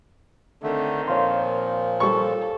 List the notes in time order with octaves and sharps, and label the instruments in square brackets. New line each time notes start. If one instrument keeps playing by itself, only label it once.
[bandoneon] D3 A3 [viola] D#3 C4
[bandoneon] A#2 F3 [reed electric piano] C#5 F5 C6
[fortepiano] G3 C#6 [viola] A4